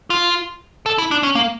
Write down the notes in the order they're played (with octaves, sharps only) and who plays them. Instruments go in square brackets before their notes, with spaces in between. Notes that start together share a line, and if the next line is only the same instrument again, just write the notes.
[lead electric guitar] F4
A4
E4
D4
C#4
A#3